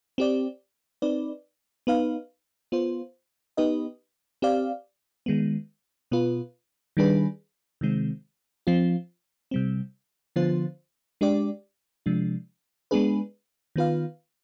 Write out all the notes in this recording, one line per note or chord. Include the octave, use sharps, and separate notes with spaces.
C4 G4 D5
C4 D#4 B4 D5
B3 D#4 B4 F5
B3 F4 C5
B3 D#4 G4 B4 D#5
C4 G4 D5 F5
D#3 G#3 B3
B2 B3 F4 B4
D#3 G3 D4 G#4 B4
C3 D#3 G#3 C4
F3 C4 F4
C3 G3 C4
D3 F3 B3 F4 C5
G#3 D4 G4 D5
C3 F3 G#3 D4
G#3 B3 D4 G#4 B4
D#3 B3 F4 B4 F5